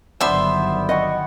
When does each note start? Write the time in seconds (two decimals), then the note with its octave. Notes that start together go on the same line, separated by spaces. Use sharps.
0.21 G1 D#3 F#3 B3 D4 C5 E5 C6
0.89 D#5 F#5 G5 C#6